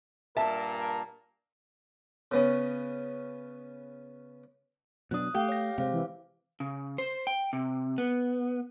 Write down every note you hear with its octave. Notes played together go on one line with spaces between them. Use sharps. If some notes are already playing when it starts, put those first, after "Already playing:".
G2 A#2 A#4 E5 A5
C#3 B3 C#4
B2 F#3 D4 D#6 F#6
A3 G4 F5
C#5 A#6
C3 G#3 C5 F5
E3
C#3
C5
G5
C3
B3